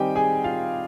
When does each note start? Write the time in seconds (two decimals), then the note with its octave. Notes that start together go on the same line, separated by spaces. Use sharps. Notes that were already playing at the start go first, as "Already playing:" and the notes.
Already playing: D#3 G3 C4 D#4 G4 D#5 G5 G#5
0.16 G#4 G#5
0.44 F4 F5